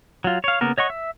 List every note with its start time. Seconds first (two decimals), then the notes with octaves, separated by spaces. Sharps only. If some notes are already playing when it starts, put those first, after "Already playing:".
0.24 F#3 F4
0.44 C#5 F5
0.61 C#3 A#3 B3 A#4
0.78 C#5 D#5 F#5 C#6
0.90 E5